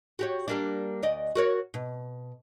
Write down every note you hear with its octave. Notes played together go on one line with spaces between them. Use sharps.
F#4 G4 C#5
G3 A#3 D4
D2 D5 D#5
F#4 A#4 C#5
B2